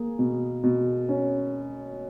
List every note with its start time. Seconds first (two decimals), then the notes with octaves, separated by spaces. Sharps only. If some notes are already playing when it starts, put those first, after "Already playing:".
Already playing: A#3 G#4
0.19 B2
0.64 B2
1.09 C#4